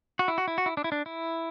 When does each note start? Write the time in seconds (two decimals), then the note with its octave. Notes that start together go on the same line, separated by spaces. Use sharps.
0.19 F#4
0.28 E4
0.38 F#4
0.48 E4
0.58 F#4
0.66 E4
0.77 D4
0.84 E4
0.92 D4
1.06 E4